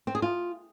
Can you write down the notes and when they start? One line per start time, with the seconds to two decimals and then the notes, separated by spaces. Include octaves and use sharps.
0.07 C4
0.15 G#4
0.22 F4